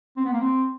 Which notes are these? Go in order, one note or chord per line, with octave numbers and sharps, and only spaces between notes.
C4
B3
A#3
C4